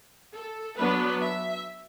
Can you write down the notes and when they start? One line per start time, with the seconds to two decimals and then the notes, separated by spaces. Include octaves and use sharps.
0.33 A4
0.77 F#3 B3 D4 B4
1.22 E5